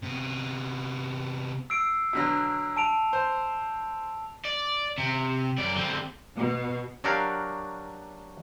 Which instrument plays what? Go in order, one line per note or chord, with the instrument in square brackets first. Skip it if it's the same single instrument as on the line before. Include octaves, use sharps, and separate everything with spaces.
[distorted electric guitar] C3 B3
[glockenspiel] E6 C7 D7
[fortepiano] B2 D3 F#3
[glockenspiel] A5 D7 F7
[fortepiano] C5
[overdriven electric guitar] D5
C3
F#2 D5
D3 C4
[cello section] B2
[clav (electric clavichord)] F#3 D4 F#4 G4 A#4 F5